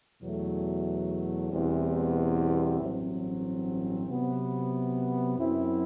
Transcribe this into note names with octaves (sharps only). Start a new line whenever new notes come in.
E2 B2 F#3 A3
E2 B2 G3 C4 E4
A1 G2 F#3 C4
C3 F#3 B3
F#2 F#3 C4 E4